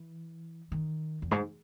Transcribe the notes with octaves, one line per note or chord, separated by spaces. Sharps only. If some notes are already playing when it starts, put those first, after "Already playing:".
Already playing: E3
D#3
E2
G#2